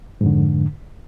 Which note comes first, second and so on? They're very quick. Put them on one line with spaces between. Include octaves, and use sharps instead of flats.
G#2 F2 D3